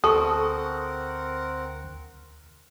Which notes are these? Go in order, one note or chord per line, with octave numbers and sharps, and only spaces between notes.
D2 C4 A4 A#4 F#5 C#6 D#6